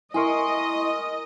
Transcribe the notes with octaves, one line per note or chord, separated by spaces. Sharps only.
E4 A#4 D#5 G#5 C6 C#6